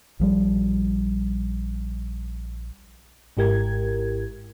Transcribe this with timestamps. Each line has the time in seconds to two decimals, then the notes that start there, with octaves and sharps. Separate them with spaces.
0.20 A#1 F3 G3
3.37 G#1 G#2 E4 G4 A#4 G#6